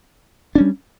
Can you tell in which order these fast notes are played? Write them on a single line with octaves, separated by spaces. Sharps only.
D4 C#4 G3